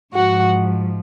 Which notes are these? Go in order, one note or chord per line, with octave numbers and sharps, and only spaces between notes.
G#2 F3 F#4 F#5